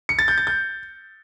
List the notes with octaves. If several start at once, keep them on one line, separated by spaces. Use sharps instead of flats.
C#7
A6
G6
A6
G6